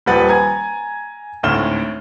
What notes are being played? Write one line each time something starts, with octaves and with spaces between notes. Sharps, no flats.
D#1 F3 G3 B4 F#5 A6
G#5 A#5 G#6
G#1 D2 A2 F6 E7 G7